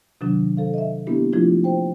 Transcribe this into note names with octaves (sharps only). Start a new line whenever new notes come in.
C3 D#3 F#3 D4
A4 C5 F5
D#5 E5
A#3 B3 D4 E4 G4
F3 A3 D4 E4 F4
C5 G5